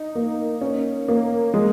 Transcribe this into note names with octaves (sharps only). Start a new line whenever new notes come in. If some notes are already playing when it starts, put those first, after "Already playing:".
Already playing: D#4
A#3
C#4
A#3
G#3